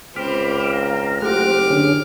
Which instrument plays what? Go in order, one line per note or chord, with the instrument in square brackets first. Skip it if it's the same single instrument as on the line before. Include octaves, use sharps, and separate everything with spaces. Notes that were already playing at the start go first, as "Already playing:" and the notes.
[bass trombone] C#2 [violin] C4 [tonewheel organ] B5 D6 F6
[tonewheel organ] F5 A#5
[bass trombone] F#1 [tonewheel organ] A3 C5 F#5 [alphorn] G4 [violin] D6 F6
[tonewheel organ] D3 C#4 G#4